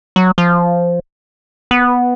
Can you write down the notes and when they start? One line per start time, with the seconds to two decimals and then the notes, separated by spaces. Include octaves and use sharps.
0.16 F#3
0.38 F3
1.71 B3